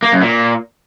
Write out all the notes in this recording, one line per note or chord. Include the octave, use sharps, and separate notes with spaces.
A#3
F#2
A#2